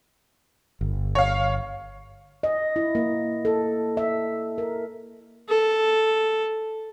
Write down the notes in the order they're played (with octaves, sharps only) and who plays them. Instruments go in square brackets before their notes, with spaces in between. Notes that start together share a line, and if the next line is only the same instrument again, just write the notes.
[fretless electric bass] G1
[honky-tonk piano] C#5 F5
[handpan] D#5
E4
A#3
A4
E5
A#4
[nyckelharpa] A4